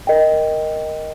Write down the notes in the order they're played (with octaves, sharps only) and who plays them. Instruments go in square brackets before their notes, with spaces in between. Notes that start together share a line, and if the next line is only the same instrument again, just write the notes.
[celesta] A#4 D#5 G5